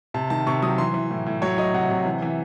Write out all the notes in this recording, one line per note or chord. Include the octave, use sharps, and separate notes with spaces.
C3 A5
D#3 A5
C3 C#6
F#3 D#6
E3 C6
E3
A2
A2
F#3 C#5
F#3 D#5
C3 F#5
C3
E3
E3